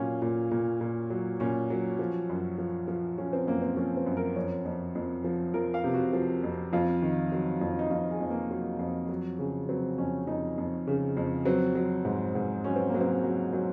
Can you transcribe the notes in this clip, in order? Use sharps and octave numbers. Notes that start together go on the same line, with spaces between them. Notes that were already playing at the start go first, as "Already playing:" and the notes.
Already playing: A#2 F#3 C#4 F4
A#2
A#2
A#2
F#3
A#2 C#4
F#3
F3
F#2
F3
F3
F3 C#4
C4
F#2 A#3
C4
F3 C#4
C4
F#2
A#4
F2 C#5
F2
F2
F3
F3 A#4
F5
C3
F#4
F3
F2
F2 F4
D#3
F#3
F2
D#4
F2 F4
G#4
F2
A#3
F#3
F2
F#3
C#3
F#3 C4
F2 C#4
F2 D#4
F2
C#3
F2
F#3 C4
F#3
G#2
G#2
F#3 C#4
C4
A#3
F#3
C4
F#3
F#3